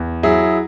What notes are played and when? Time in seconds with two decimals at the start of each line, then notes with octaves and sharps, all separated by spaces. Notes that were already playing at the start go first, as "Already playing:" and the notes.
Already playing: E2
0.23 F#3 E4 G#4